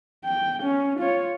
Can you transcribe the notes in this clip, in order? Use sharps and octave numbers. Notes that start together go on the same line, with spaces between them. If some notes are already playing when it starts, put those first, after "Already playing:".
G5
C#4
F4 C#5